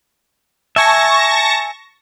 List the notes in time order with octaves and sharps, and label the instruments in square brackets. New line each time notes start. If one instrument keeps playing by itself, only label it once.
[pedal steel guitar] E5 G#5 [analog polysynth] A5 C#6 A#6